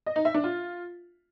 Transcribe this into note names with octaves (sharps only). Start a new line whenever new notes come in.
D#5
D#4
E5
D4
F4